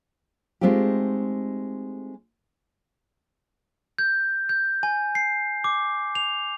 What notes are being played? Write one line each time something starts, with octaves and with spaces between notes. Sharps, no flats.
G#3 A3 C4 D#4 F4 G4
G6
G6
G#5
C7
D6
F7